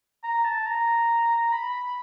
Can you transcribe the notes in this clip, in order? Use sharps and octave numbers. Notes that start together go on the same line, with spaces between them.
A#5
A5
A#5
B5